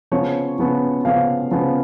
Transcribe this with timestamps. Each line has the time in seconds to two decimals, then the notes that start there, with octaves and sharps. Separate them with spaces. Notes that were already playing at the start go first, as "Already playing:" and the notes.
0.12 C#3 F3 B3 C#5
0.58 C#3 F3 B3
1.05 C#3 F3 B3 F5
1.51 C#3 F3 B3